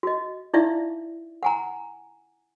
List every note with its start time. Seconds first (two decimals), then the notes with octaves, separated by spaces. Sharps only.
0.03 F#4 D#5
0.54 D#4 E4 D5 E5 F5
1.43 F#5 G#5 A#5